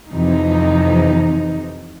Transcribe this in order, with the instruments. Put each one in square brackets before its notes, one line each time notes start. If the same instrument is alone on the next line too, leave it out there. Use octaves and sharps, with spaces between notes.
[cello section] F2 C3 E3 D#4